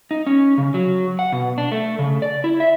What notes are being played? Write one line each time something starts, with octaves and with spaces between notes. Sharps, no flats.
D#4
C#4
C#3
F#3
F#5
B2
D4
A3
C#3
D5
E4
E5